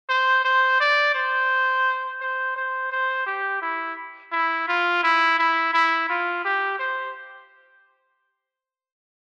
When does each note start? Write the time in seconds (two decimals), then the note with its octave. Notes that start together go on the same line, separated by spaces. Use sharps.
0.09 C5
0.45 C5
0.80 D5
1.15 C5
2.21 C5
2.56 C5
2.92 C5
3.27 G4
3.62 E4
4.32 E4
4.68 F4
5.03 E4
5.39 E4
5.74 E4
6.09 F4
6.45 G4
6.79 C5